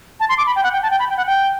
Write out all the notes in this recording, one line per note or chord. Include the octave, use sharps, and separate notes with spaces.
A5
C6
D6
B5
G5
F#5
G5
A5
G5
B5
G5
F#5
G5